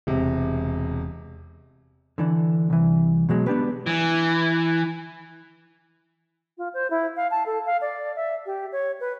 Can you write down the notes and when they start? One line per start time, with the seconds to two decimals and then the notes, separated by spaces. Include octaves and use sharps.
0.07 E1 C3
2.18 D3 E3 D4
2.70 C2 E3
3.29 B2 F#3 G#3
3.47 B3 D4 G4 B4
3.87 E3
6.58 F4
6.74 C5
6.90 E4
7.16 F5
7.31 A5
7.46 A4
7.66 F5
7.81 D5
8.16 E5
8.46 G4
8.72 C#5
9.00 B4